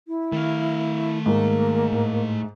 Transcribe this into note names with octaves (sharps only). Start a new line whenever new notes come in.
E4
D#3 A3 F5
G#2 A#3
A2